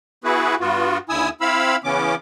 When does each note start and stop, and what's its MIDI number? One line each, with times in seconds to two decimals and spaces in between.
0.24 0.55 59
0.24 0.55 64
0.24 0.55 66
0.24 0.55 68
0.24 0.55 71
0.60 0.98 43
0.60 0.98 59
0.60 0.98 65
0.60 0.98 66
1.09 1.29 39
1.09 1.29 50
1.09 1.29 64
1.09 1.29 80
1.09 1.29 87
1.09 1.29 88
1.41 1.76 60
1.41 1.76 64
1.41 1.76 77
1.41 1.76 83
1.41 1.76 88
1.84 2.15 49
1.84 2.15 52
1.84 2.15 59
1.84 2.15 61
1.84 2.15 86